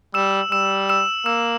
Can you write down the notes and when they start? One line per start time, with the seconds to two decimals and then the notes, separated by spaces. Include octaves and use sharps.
0.14 G3 E6 E7
0.52 G3 E6 E7
0.89 E6 E7
1.26 A#3 E6 E7